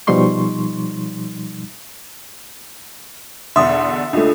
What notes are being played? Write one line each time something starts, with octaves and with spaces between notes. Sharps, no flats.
B2 F3 G3 D#4 C6 C#6
E2 B2 D3 E5 C6 D#6
C#2 A3 D4 F4 A4